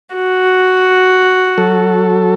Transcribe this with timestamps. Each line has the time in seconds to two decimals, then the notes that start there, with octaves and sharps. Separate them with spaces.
0.15 F#4
1.58 F#3 A4